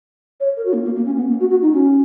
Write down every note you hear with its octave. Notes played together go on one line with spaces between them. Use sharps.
C#5
A#4
F#4
A#3
A#3
A#3
C#4
B3
A#3
F#4
F#4
D#4
C#4